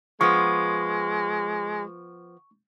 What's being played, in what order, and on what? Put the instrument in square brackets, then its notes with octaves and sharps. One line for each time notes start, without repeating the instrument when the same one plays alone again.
[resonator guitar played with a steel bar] F3 B3 [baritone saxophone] G#3 [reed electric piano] C#6